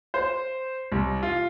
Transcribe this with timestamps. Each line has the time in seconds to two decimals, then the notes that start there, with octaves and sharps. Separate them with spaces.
0.14 C5
0.92 C2
1.23 F4